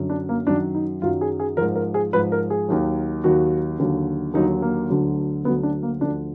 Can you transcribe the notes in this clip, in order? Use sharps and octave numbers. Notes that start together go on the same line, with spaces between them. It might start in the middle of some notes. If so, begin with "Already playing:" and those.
Already playing: F#2 D3 F#3
D4
A#3
F#2 D#3 F#3 D4
D#4
F#2 D#3 F#3 F4
G#4
G#4
G#2 F3 A#4
A#4
G#4
G#2 F3 B4
A#4
G#4
D#2 D#3 F#3
D#2 D#3 F#3 F#4
D#2 D3 F#3
D#2 D3 F#3 D#4
A#3
D2 D3 F#3
D2 D3 F#3 B3
D4
A#3
D2 D3 F3 D4